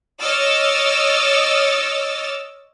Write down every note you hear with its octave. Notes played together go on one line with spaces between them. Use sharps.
C#5 D#5 D6 E6 F6 A6